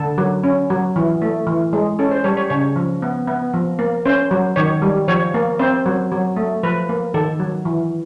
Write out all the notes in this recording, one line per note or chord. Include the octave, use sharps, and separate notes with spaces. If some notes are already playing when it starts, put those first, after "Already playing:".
Already playing: D3 A4
F#3
C#4
F#3
E3
A3
E3
G#3
C#4 A4
C5
G3 C#5
C#5
C#3 C#5
F3
B3
B3
F3
A#3
C#4 C5
F#3
D#3 C#5
G3
F3 C#5
A#3
C4 C5
F#3
F#3
A3
F3 B4
A#3
D#3 A4
F#3
E3